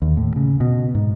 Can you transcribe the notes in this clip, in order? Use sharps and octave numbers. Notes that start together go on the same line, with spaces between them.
D#2
A2
C#3
B2
G#2